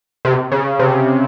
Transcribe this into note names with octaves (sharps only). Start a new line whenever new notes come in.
C3
C#3
C3